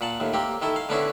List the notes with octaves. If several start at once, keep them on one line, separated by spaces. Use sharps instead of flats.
A#2 F#5 A5
D#2 A2
A#3 C4 G4
D#3 E4 A4
F5
D3 B3 C#4 D4 E4